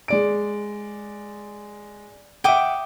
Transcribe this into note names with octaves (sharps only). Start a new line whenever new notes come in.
G#3 D5 D7
E5 F#5 G5 D6 D#6